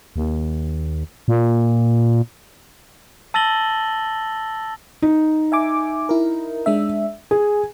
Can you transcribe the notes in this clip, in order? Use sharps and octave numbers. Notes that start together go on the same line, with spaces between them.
D#2
A#2
A5 E6 A6 A#6 F#7 G7
D#4
E5 G#5 D6
E4 A#4
G#3 D4 E5
G#4 G#5